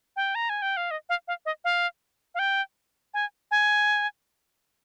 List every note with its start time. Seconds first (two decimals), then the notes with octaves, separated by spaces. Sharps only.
0.16 G5
0.35 A#5
0.49 G#5
0.62 G5
0.77 F5
0.91 D#5
1.09 F5
1.28 F5
1.46 D#5
1.64 F5
2.35 F5
2.39 G5
3.14 G#5
3.51 G#5